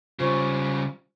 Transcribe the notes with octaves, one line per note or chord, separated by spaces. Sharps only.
C#3 G3 F4 C5 C#6